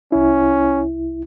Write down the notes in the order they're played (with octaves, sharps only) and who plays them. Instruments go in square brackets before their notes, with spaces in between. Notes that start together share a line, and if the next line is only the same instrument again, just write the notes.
[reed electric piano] C2 E4 [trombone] C#4